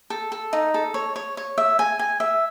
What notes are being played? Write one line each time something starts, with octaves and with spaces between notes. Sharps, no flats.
A4
A4
D#4
A4
C#5
C#5
C#5
E5
G#5
G#5
E5